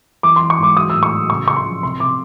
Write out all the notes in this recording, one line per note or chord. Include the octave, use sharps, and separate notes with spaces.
E3 D6
C6
E3
C#6
G#2 D6
F#3 D#6
A2 E6
C#6
F#3
C#3 C#6
C#3 C#6
C6
F3
C3 C6
C3 D6